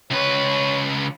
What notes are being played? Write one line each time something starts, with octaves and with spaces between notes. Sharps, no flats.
C#2 B4 C#5